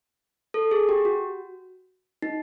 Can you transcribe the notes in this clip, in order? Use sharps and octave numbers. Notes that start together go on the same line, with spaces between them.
A4
G#4
G4
F#4
D#4